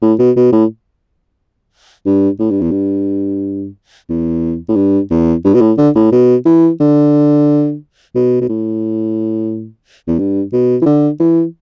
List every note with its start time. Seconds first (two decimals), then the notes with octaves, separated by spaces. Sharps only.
0.02 A2
0.19 B2
0.36 B2
0.52 A2
2.06 G2
2.39 A2
2.51 G2
2.61 E2
2.71 G2
4.09 E2
4.69 A2
4.76 G2
5.10 E2
5.44 G2
5.54 B2
5.61 A2
5.77 D3
5.95 A2
6.12 B2
6.45 E3
6.80 D3
8.15 B2
8.41 B2
8.49 A2
10.07 E2
10.19 G2
10.53 B2
10.82 E3
10.86 D3
11.20 E3